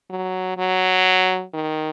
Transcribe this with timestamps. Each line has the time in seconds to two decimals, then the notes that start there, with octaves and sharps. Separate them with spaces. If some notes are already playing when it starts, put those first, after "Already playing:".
0.10 F#3
0.58 F#3
1.54 D#3